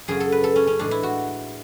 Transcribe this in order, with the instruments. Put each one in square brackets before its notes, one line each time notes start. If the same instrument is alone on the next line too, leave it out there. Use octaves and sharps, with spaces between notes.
[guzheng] F#2 C#3 F#3 G#4
A4
B4
A4
C#4
C#4
A2 E3 G#3 D4
E4
F#4